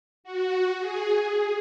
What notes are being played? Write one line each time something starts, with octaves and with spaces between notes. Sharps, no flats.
F#4
G#4